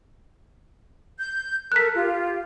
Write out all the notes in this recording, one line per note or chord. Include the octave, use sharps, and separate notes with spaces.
G6
A4 A#4 F#6 B6
F4 G4